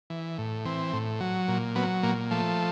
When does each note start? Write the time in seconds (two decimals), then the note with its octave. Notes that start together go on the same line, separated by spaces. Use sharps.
0.10 E3
0.38 A2
0.65 E3 C4
0.93 A2
1.20 F#3
1.48 A#2
1.76 F#3 B3
2.03 A#2 A#3
2.31 F3 A3